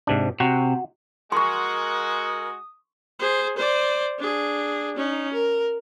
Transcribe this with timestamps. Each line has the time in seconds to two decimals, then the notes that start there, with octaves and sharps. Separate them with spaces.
0.07 G#2 C3 D4
0.40 C3 F#4
1.32 G#3 F#4 A#4 C6 C#6 D#6
3.19 G#4 C5
3.57 C5 D5
4.19 D4 G#4
4.96 C#4 D#4
5.33 A#4